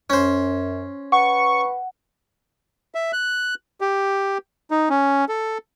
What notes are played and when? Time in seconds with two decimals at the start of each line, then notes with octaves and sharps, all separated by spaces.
0.10 F#2 C#4 C5
1.12 B4 F#5 C#6
2.95 E5
3.13 F#6
3.81 G4
4.71 D#4
4.90 C#4
5.29 A4